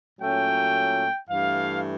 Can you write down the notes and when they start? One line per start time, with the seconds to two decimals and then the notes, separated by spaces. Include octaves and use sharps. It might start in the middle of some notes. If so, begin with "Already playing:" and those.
0.20 A#2 F#3 A3 C#4 G5
1.29 G2 E3 A3 F5